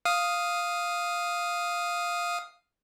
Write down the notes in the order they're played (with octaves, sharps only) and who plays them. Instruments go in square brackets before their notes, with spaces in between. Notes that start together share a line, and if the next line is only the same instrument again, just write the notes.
[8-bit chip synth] F5 D#6